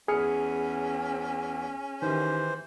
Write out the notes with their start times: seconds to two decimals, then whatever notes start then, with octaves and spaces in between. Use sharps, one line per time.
0.08 E2 C#4 G#4 B5 F6 C#7
2.02 D#3 E3 G4 C5